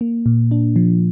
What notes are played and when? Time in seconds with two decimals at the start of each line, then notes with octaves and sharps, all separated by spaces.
0.01 A#3
0.26 A#2
0.51 D4
0.76 F3